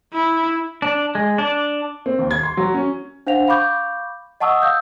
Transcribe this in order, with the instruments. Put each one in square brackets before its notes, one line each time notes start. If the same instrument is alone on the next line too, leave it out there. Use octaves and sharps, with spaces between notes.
[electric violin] E4
[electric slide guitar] D4
G#3
D4
[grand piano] C4
D#2
G#6
C6
F#3
C#4
[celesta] D4 C5 F5 F#5 F7
F5 B5 C#6 D6 G6
D#5 F#5 A5 C#6 D#6 E6
F5 E6 G6